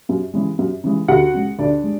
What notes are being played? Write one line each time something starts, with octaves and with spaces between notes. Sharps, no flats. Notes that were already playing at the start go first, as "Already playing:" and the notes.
F#2
C#3 E3 G#3
F#2
C#3 E3 G#3
D2 F#4 F#5
C#3 G#3
D2 D4 D5
G#3